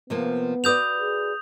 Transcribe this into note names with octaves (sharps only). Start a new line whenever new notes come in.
C3 F3 A#3 B3
F#4 B4 D5 D#6 G6 F7
G#4